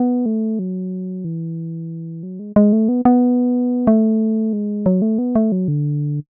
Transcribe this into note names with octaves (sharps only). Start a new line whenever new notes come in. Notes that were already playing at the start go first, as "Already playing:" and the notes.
Already playing: B3
A3
F#3
E3
F#3
G#3
G#3
A3
B3
B3
A3
G#3
F#3
A3
B3
A3
F#3
D3